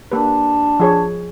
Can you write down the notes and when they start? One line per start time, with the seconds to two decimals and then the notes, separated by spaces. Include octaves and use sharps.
0.12 A#3 D4 G4 B4
0.80 F3 G#4 C#5